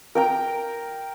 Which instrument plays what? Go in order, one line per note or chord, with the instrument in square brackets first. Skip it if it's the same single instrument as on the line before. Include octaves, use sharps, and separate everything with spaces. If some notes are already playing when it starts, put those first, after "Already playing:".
[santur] A#4 G5 A#5